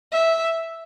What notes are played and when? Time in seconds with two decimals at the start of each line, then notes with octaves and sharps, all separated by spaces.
0.12 E5